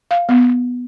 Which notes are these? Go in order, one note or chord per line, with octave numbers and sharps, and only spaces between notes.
F5
B3